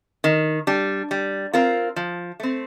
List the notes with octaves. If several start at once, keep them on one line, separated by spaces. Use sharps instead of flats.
D#3
G3 D4
G3
C4 F4 A#4
F3
A3 C4